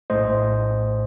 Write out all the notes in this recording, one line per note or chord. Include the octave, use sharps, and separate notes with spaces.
A#1 A2 A3 C5 D#5